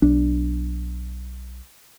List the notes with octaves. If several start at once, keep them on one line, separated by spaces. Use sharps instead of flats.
B1 D4